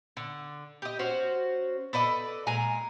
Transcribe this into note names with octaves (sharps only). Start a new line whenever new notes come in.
D3
G4 D#5
C#4 F#4 C5
A4 B4 D5 D#5
A#2 G#3 G#5 A#5